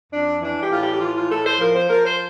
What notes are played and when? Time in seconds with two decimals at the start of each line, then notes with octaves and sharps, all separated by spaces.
0.12 F2 D4
0.41 E3 D4
0.61 G4
0.71 A2 F4
0.81 G4
0.92 G4
1.00 E3 F4
1.15 F4
1.30 A2 A4
1.45 C5
1.60 F3 A#4
1.74 C5
1.89 F3 A#4
2.04 C5